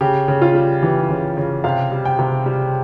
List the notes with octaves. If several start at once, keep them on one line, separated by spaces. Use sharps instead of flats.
C#3 G4
C#3
F4
G3
E3 G4
C#3
C#3
C3 F5
G3
G5
C3
G3